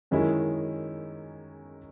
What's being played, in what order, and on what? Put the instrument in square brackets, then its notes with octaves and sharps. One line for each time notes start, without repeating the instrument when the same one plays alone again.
[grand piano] F#2 D#3 G#3 C#4 E4